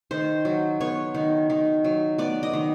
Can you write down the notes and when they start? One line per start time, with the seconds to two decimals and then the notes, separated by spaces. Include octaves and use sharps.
0.11 D#3 C5
0.45 F#3
0.80 B3 C#5
1.15 D#3
1.50 D#3
1.84 F#3
2.18 B3 D5
2.43 D#5
2.53 D#3